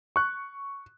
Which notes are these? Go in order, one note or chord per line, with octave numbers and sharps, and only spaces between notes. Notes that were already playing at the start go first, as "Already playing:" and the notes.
C#6 F#6